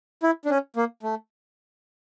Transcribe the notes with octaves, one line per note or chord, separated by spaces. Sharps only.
E4
D4
C#4
A#3
A3